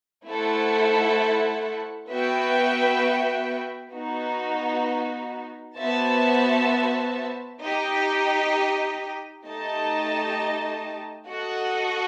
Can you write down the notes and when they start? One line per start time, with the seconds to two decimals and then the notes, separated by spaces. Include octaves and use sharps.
0.25 A3 E4 A4 C5 F#5
2.09 B3 F#4 B4 E5 G5
3.93 B3 D#4 F#4
5.77 B3 F#4 C5 E5 A5
7.61 D#4 G4 D#5
9.46 A3 D#4 G4 D#5 A5
11.28 F#4 A4 D#5 F#5